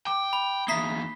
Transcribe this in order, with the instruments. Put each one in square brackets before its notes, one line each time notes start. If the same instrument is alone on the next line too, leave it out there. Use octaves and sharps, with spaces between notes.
[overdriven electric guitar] G5 [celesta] D6
[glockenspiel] B5
[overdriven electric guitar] E2 A#3 [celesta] E5 A#5 D#6 [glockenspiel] B6 C7 G7